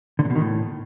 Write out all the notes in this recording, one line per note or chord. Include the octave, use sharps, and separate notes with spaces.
D3
A#2
B2
D#3
A2